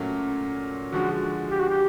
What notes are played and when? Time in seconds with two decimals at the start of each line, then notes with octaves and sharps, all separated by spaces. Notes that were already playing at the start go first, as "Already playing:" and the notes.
Already playing: A#2 F#3 A3 C#4
0.92 D3 F3 G#3 F#4
1.51 G4
1.60 F#4
1.69 G4